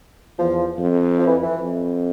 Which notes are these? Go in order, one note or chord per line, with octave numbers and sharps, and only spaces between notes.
E2 F3
F2
F3
E3
E3
F2